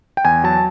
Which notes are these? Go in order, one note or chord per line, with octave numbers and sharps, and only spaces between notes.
G5
E2 G#5
F#3 A5